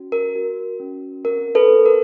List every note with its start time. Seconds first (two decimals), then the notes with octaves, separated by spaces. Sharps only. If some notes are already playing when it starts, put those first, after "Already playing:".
Already playing: C#4 F#4
0.12 A#4
0.35 F#4
0.80 C#4
1.25 C4 A#4
1.55 A4 B4
1.71 C4
1.86 A#4